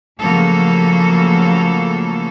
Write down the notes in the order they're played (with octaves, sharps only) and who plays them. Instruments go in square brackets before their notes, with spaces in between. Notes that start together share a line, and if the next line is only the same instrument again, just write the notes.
[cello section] C#3 F3 F#3 A3 A#3 A4